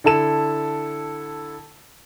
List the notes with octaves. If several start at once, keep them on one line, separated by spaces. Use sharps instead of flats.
D3 E4 A4 E7